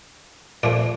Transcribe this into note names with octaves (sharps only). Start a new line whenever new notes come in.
A#2 F3 A3 D5